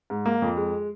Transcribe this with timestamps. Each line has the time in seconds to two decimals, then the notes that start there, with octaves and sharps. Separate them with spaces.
0.10 G#2
0.26 A#3
0.42 F2
0.57 G#3